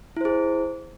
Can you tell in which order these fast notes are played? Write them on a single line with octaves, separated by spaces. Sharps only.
E4 C5 G#4